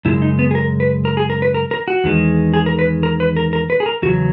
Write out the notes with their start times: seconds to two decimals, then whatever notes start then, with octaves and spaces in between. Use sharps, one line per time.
0.05 F#2 C#3 G#3 E4
0.22 D#4
0.39 B3
0.51 G#4
0.55 A#4
0.80 B4
1.05 A#4
1.17 G#4
1.30 A#4
1.42 B4
1.54 A#4
1.71 A#4
1.88 F#4
2.04 E2 D#3 G#3
2.54 G#4
2.66 A#4
2.79 B4
3.03 A#4
3.20 B4
3.37 A#4
3.53 A#4
3.70 B4
3.80 G#4
3.86 A#4
4.02 E2 C#3 F#3 F#4